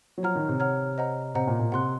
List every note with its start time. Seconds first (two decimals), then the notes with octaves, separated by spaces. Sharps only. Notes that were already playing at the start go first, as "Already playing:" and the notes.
0.18 F#3
0.23 F3 C#5 F#5 A#5 F6
0.35 D#3
0.48 C3
0.60 C#5 F#5 A#5 F6
0.98 C5 D#5 F#5 A#5
1.35 C3 C5 D#5 F#5 A#5
1.47 A#2
1.59 A#2
1.72 C3 F#5 C6 F#6